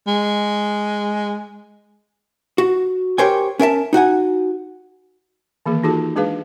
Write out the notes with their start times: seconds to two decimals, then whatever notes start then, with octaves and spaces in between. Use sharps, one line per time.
0.07 G#3
2.58 F#4
3.18 G4 A#4 C5 C#5 G5 G#5
3.59 C#4 A#4 E5 A5
3.93 D#4 F#4 F#5 G#5
5.66 D#3 E3 A#3 G#4
5.83 D#4 F4 F#4 G#4 A4 A5
6.16 G#3 D4 G#4 B4 F5